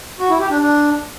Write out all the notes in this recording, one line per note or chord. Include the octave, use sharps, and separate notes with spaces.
F#4
E4
G4
D4
D4